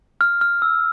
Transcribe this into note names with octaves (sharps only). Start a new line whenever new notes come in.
F6
F6
E6